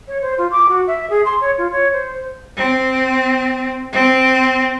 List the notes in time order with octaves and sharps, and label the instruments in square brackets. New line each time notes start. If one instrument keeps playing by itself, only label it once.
[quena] C#5
C5
F4
D6
F#4
E5
G#4
C6
C#5
F4
C#5
C5
[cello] C4
C4